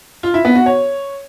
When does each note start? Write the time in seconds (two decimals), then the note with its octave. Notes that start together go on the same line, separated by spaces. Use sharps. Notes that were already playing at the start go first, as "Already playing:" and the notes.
0.23 F4
0.34 E4
0.45 B3
0.55 F#4
0.66 C#5